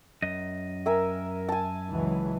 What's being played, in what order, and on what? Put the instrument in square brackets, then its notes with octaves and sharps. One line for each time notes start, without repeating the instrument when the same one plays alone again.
[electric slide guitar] F#2 D#5
[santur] A#4 E5 G#5
G#5 A5
[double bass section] C#2 E3 F#3